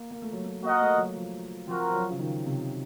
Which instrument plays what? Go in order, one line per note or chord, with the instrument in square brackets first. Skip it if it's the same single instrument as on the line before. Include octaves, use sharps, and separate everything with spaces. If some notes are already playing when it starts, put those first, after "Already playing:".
Already playing: [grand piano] A#3
A#3
A3
F#3
A3
[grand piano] A#3 [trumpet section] F#4 A#4 D#5 F#5
[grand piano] A3
F#3
F3
[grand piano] F3 [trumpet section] C4 F#4 A#4
[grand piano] F3
F#3
C#3
D#3
C3